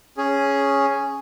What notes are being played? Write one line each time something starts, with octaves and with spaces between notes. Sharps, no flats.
C#4 G#4